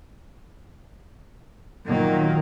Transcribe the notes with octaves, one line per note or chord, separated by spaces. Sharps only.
A#2 D#3 F#3 A#3